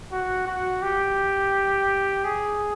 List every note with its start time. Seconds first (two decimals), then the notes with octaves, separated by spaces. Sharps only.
0.12 F#4
0.47 F#4
0.82 G4
2.24 G#4